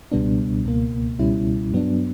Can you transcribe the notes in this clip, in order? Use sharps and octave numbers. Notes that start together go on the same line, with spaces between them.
C#2 B2 G3 B3 D4
C#2 B2 A#3
C#2 B2 G3 C#4 E4
G2 F#3 B3 D4